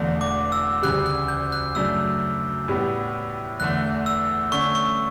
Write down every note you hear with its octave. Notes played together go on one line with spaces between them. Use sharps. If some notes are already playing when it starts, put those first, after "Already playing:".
Already playing: E1 E2 D3 A3 D4
D6
E6
D2 C#3 G3 F#6
F#6
G6
F#6
F#2 C#3 F#3 A3 D4 E6
A2 G3 B3
E2 D3 A3 F#6
E6
D3 A3 C#4 C#6
C#6